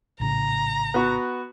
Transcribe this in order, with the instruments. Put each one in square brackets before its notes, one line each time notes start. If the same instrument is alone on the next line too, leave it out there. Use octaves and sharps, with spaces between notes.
[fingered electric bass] A#1 A2 C#3 [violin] A#5
[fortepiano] B3 F#4